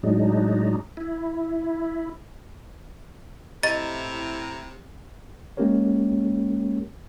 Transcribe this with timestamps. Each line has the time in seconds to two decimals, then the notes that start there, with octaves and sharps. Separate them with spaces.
0.03 A2 F#3 G#3 D4 D#4
0.97 E4
3.63 A2 C3 E4 D#5 A#5 A6
5.57 G#3 A#3 C#4 G4 A#4 C#5